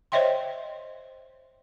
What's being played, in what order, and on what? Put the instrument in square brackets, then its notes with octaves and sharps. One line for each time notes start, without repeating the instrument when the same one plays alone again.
[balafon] C5 C#5 D#5 E5 G5 C6